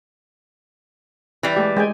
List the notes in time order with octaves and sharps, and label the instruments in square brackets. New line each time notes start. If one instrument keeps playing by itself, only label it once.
[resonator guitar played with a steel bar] E3 G3
[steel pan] G#3 A3 G4
G#3 G5 G#5